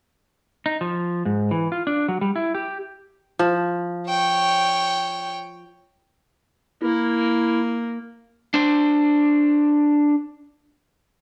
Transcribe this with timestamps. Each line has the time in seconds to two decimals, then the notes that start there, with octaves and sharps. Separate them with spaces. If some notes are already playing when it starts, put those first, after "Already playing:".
0.66 D#4
0.81 F3
1.25 G#2
1.51 E3
1.72 F4
1.87 D4
2.08 F#3
2.21 G3
2.36 E4
2.55 G4
3.39 F3
4.08 C#5 G5
6.82 A#3 E4
8.54 D4 C5